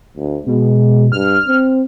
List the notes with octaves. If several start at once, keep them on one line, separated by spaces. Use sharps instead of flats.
D2
B2 G#3
G2 F6
C4